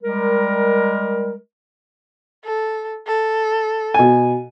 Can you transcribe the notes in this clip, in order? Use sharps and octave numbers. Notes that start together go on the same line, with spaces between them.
G3 G#3 A#4
A4
A4
B2 G#5